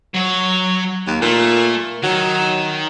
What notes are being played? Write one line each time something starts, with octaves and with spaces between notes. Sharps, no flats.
F#3 C#5
D#2
A#2 A3
D#3 F#3